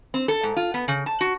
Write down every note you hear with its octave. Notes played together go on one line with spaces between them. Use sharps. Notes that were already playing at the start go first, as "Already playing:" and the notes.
C4
A4
G#2
F4
B3
C#3
A5
F#4